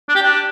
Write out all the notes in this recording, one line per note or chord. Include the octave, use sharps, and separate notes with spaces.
D4
G4
D4